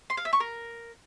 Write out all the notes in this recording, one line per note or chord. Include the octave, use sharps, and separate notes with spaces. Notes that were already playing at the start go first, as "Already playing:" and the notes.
C6
F5
E5
C#6
A#4